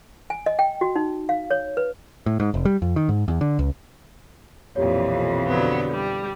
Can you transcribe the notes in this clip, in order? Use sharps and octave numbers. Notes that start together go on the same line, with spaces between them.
G#5
D#5
G5
F#4
D#4
F5
C#5
B4
A2
G#2
F1
G3
F2
D#3
G#2
E2
D3
C#2
B1 F2 A#2 E3 G4 C#5
D3 F#3 B3
G3